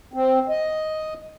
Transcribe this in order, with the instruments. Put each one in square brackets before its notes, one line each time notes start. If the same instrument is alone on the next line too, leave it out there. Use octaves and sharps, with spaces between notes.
[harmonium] C4
D#5